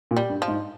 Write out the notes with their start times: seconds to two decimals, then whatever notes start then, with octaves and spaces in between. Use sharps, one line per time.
0.11 A#2
0.17 G3
0.30 G2
0.42 F3
0.48 G#2